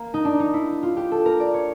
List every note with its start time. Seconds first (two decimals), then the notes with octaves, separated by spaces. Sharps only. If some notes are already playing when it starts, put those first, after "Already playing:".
Already playing: A#3
0.14 D#4
0.25 D4
0.40 D#4
0.54 E4
0.83 F4
0.97 G4
1.11 A4
1.25 A#4
1.40 D5
1.54 C#5